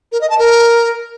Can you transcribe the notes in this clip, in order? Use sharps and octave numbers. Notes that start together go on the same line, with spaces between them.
A#4
D#5
A5
A#4